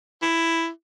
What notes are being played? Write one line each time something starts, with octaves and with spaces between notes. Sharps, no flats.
E4